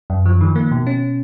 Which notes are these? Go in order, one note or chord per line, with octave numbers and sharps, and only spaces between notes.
F#2
F3
D#3
A#3
B2
C#4